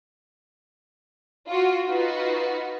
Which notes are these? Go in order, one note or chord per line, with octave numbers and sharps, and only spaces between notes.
F4 F#4
D#4 F4 F#4 B4